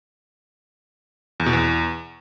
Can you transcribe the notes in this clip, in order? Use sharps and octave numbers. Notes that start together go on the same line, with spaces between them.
E2
B2
E2